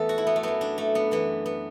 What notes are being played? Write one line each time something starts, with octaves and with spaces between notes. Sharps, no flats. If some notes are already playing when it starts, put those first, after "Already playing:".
Already playing: E2 A3 B3 A4
F#4
E4
B3
A3
F#2 F#3 B3
D4
A3
B3
F#2 E3 B3
B3